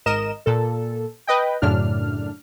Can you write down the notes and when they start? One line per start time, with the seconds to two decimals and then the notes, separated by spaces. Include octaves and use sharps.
0.06 G#1 A#4 D#5 E7
0.46 A#2 A4
1.27 B4 D#5 G5
1.62 F#2 A2 C#3 D4 F6